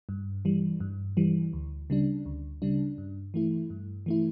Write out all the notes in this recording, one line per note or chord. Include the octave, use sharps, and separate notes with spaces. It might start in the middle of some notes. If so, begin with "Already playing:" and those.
G2
E3 G3
G2
E3 G3
D2
C#3 G3 D4
D2
C#3 G3 D4
G2
E3 A3 E4
G2
E3 A3 E4